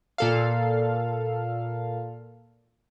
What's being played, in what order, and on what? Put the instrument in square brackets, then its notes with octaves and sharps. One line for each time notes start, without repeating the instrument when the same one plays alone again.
[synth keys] A#2 A4 F5